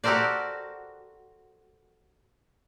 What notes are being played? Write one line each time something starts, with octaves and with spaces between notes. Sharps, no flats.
F#4 G4 A4 A#4 C5 D5